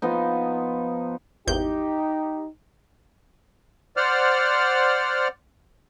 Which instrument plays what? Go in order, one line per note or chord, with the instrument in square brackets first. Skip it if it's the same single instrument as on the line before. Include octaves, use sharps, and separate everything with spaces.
[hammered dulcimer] F3 B3 D#4
[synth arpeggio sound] G#1 E2 G6 [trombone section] D#4 G4
[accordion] C5 D5 F#5 F6